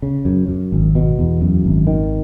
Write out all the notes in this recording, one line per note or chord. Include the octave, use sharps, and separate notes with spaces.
C#3
F#2
F#2
G#1
B2
E2
F#2
G#1
D#3